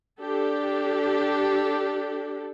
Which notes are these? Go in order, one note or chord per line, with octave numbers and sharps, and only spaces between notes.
D4 G4 A4